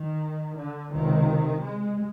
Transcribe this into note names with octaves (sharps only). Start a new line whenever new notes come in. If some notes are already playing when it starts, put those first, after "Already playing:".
Already playing: D#3
D3
C#2 C3 D#3
G#3